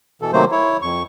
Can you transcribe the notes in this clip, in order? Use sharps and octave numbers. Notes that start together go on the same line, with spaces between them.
B2 E3 A4
C3 D#3 F#3 A3 A#3 C5
E4 C#5
F2 C#6